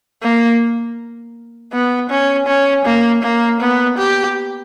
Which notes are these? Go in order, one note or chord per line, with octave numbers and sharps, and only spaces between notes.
A#3
B3
C#4
C#4
A#3
A#3
B3
G4